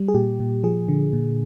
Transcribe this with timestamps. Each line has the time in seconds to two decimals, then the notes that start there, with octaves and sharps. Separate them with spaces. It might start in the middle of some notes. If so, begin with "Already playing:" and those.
Already playing: G3
0.08 G#4
0.14 A#2 G4
0.40 A#2
0.64 F3 G#4
0.89 D3
1.13 A#2